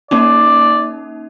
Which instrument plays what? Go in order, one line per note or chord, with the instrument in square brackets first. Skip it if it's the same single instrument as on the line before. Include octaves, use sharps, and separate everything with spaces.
[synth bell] A#3 C#4 D#4 [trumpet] D5